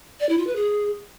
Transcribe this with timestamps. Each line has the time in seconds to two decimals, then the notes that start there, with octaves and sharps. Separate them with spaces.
0.20 D5
0.29 E4
0.38 F4
0.47 B4
0.56 G#4